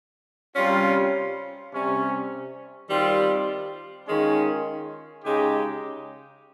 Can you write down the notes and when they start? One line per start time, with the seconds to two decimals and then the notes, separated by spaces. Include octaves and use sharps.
0.55 C3 G3 C#4 F4
1.72 C3 G3 C#4
2.88 D#3 G3 C4 F4
4.06 D#3 G#3 C#4 F4
5.23 C#3 G#3 D#4 G4